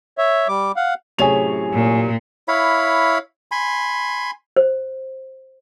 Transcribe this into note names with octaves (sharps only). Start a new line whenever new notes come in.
C#5 E5
G3 D6
F5 F#5
F#2 A2 C3 G#4 C#5 F7
A#2
E4 C#5 F5 B5
G#5 B5 C6
C5